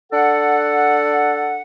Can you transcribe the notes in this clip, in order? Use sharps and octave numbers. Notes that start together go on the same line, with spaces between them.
D4 A4 F#5